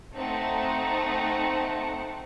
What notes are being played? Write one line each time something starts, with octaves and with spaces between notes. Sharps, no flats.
A3 C4 D#4 F#5